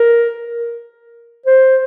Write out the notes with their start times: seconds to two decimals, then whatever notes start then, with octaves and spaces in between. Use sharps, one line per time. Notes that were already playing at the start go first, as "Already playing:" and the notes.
Already playing: A#4
1.46 C5